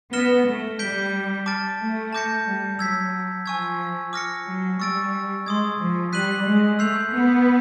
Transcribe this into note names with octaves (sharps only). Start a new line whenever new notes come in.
B3 F6 A#6 C#7 E7 G7
A3
G3 G6 B6 D7 G7
A5 D6 F6 A6 D7
A3
A5 D6 G6 A#6 C#7
G3
F#3 E6 G#6 B6
F3 G#5 C#6 E6 G#6
D6 F6 A#6 C#7
F#3
G3 C#6 E6 A6 D7
G#3 C6 D#6 G#6
F3
G3 F#6 B6 D#7 F#7
G#3
A3 E6 G6 C7 F7
B3